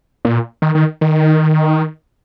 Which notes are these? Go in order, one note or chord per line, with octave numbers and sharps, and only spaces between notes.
A#2
D#3
D#3
D#3